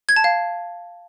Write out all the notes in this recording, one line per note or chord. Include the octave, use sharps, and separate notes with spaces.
G#6
A5
F5